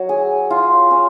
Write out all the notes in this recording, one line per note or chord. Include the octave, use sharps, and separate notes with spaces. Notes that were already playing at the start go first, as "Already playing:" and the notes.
Already playing: F#3
G#4
F4
C#4